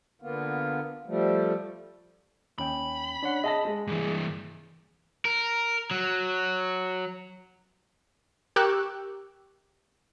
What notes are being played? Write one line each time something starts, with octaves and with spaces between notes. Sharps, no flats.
D3 A#3 B3 F4
F3 G3 A3
D#2 C#4 G5 B5
D4 C#5 F#5
G#4 D#5 A5 A#6
G#3
G2 E3
A#4
F#3
G4 A#4 C#6 D6 E6 F#6